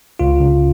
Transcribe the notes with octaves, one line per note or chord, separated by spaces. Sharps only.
C#2 F4
C#3